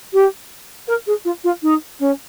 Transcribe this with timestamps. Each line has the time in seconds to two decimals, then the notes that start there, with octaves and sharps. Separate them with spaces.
0.13 G4
0.87 A#4
1.06 G#4
1.25 F4
1.44 F4
1.62 D#4
1.99 C#4